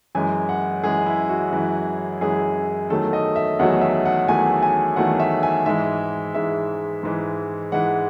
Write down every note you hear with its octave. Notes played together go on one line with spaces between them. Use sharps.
F#2 E3 G#3 G#5
F#5
F#2 E3 G#3 G#4
E4
F#4
F#2 E3 G#3
F#2 E3 G#3 G#4
E2 D#3 F#3 A3 A4
D#5
E5
E2 D#3 F#3 A3 F#5
E5
F#5
E2 D#3 F#3 A3 G#5
G#5
E2 D#3 F#3 A3 F#5
E5
G#5
G#2 E3 G#3 E5
G#2 E3 G#3 E5
G#2 E3 G#3
G#2 E3 G#3 F#5